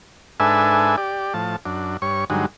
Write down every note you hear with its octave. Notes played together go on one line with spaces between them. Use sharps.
G#2 D4 A4 B4 E5 G#5
G4 D5
A2 F3 A5
F#2 D4
G2 C#5 C#6
G2 D3 F#3 G#3 D#4